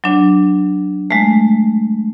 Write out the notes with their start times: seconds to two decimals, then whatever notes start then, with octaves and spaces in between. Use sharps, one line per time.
0.04 F#3 D4
1.11 G#3 A3